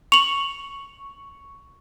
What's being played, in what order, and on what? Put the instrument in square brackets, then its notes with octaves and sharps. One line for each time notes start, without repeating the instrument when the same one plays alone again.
[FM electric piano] C#6 [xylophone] F7 F#7